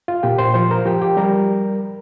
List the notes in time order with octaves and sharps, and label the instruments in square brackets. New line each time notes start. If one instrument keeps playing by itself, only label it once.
[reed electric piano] F4 F5
A#2 G4 G5
C5 C6
F3 C5 C6
A#4 A#5
F3 G4 G5
G4 G5
G3 A#4 A#5